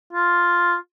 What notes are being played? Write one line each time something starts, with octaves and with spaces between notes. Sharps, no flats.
F4